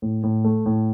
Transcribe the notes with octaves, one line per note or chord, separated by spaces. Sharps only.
A2
A2
A3
A2